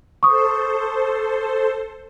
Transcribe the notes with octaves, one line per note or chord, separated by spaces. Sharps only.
A4 C5 C#6 D#6